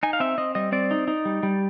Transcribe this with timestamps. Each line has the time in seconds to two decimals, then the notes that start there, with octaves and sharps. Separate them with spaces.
0.03 D#4 G#5
0.13 F5
0.20 C4 E5
0.38 C4 D#5
0.55 G3 D#5
0.72 C4 D5
0.91 D#4
1.08 D#4
1.25 G3
1.43 G3